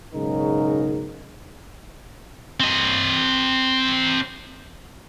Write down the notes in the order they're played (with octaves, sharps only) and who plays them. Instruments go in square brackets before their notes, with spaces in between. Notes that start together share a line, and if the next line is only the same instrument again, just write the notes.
[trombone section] B1 G#2 C#3 F#3 D#4 A#4
[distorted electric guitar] C4 D#5